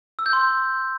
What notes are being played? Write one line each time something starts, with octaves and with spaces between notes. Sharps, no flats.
E6
G6
C6